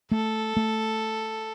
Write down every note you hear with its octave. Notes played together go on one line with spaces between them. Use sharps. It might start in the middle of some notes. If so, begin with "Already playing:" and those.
A3 A4
A3